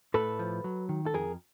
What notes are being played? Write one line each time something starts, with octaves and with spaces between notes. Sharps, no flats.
A2 A4 B4
F3
F#3
D#3
A4
F2 G#4 A#4